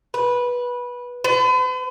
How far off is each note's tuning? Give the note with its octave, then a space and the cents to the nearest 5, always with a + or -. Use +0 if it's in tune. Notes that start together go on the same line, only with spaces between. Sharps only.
B4 -15
B4 +45